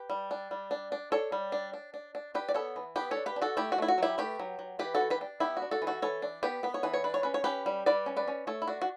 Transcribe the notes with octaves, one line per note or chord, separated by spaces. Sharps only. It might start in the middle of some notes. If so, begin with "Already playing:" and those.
Already playing: G4 B4
G3
D4
G3
D4
D4
D4 A4 C#5
G3
D4
D4
D4
D4
D4 G4 B4
D5
B3 A4 C#5
E3
B3 G4 B4
A4 C#5
D4
G4 B4
D4
F#4 A4
A3 E4 G4
F#4
A3 E4
F#4
F#3 E4 G4
A3 G4 B4
F#3
F#3
E3 G4 B4
F#4 A4
E3
G4 B4
D4
B3 E4 G4
F#4
D4
F#4 A4
E3
F#4 A4
E3 A4 C#5
D4
B3 G4 B4
B3 B4
C#5
E3 B4
C#5
D4 B4
C#5
C#4 B4
C#5
C#4 G4 B4
G3
G3 B4 D5
C#4
B4 D5
C#4
A3 A4 C#5
E4
D4 F#4
F#4